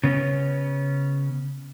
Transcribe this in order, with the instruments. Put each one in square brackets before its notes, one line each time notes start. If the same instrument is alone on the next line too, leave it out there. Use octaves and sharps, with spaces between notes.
[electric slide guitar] C#3 B3 C#4